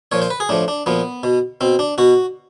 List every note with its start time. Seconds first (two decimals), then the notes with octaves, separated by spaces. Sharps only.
0.12 A#2 F3 C#5
0.22 C5
0.30 B4
0.40 G#4
0.49 A2 F3 D4
0.68 D4
0.86 A#2 F3 B3
1.23 B2
1.61 B2 C4
1.79 D4
1.98 B2 F#4